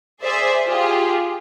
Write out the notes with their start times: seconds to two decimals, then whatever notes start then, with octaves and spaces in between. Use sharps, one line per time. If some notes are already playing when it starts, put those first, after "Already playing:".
0.22 G#4 C5 D5 E5
0.66 F4 G4 G#4